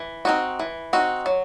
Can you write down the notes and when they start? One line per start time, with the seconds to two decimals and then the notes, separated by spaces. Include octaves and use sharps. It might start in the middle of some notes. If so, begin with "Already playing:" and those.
Already playing: E3
0.25 C4 D#4 F#4
0.59 E3
0.93 C4 D#4 F#4
1.26 F#3